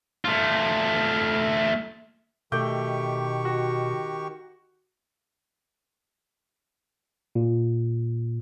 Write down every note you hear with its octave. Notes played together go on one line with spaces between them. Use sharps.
A3 F4
B2 D#3 A3 G4 C#6 D6 G6
F#4
A#2